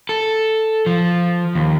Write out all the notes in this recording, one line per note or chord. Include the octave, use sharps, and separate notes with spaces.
A4
F3
D#2